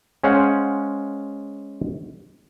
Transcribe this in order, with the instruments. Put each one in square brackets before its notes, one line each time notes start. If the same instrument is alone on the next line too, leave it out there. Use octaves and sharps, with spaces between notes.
[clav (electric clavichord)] G#3 C#4 C5 F5 F#5